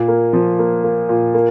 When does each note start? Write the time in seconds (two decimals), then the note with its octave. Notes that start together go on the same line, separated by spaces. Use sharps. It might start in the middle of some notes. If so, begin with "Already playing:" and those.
Already playing: A#2
0.08 A#3
0.33 F3
0.59 A#3
0.84 A#3
1.09 A#2
1.34 A#3